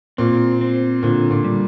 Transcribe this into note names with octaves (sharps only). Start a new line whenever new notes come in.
A#2 C4
C4
A#2 D3
A#2
G3